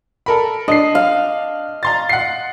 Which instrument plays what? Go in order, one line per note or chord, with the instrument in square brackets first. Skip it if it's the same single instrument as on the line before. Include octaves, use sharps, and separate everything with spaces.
[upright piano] A4 A#4 B5
[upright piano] D4 C7 [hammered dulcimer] D#5
[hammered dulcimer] F5
[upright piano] A#5 C6 A6
F#5 C7